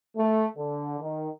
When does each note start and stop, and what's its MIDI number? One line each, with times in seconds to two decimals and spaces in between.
0.16 0.45 57
0.56 0.96 50
1.00 1.28 51